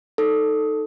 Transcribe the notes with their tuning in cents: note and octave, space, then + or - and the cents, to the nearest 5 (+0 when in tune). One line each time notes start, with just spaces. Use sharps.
D#4 +0 A4 +5